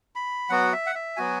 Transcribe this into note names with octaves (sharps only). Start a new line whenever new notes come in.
B5
F#3 B3 F#4 F#5
E5
F#5
E5
F#3 B3 F#4 G#5